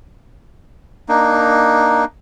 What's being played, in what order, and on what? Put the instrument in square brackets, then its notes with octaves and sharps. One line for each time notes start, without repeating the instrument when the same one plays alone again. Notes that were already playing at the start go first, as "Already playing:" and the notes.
[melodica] A#3 D4 D#4